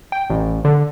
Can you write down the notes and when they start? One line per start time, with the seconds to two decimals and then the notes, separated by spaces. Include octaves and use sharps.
0.12 G5
0.30 A1
0.65 D3